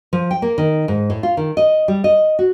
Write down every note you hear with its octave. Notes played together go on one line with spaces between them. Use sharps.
F3
G5
A#3
D#3
G#2
A2
F4
D#3
D#5
G3
D#5
F#4